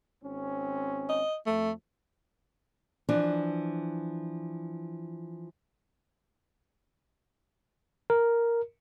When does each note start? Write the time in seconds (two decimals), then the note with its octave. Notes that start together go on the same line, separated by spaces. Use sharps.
0.22 G#1 C4 C#4
1.09 D#5
1.46 F2 A3
3.09 E3 F3 D4
8.10 A#4